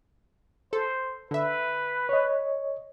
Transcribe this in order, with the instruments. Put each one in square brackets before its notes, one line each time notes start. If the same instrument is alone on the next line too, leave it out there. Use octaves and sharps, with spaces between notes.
[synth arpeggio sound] A4 [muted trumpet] C5
[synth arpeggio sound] D3 E5 [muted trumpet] B4
[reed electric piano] C#5 D#5